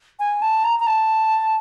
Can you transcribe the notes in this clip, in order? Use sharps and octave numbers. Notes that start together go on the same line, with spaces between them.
G#5
A5
A#5
A#5
A5